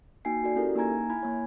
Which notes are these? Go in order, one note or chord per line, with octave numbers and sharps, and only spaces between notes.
A#3 D#4 F#4 G5 G#5 C7
F#4 A4 D5
C#4 E4 G4 A4 A#4
A#3 D#4 G#5 A#5 G#6
E4 G#5 B5 G#6
A#3 C#5